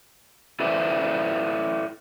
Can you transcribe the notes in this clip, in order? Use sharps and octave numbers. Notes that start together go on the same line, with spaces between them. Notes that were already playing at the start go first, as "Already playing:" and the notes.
E4 A4 B4 C5 D5 E5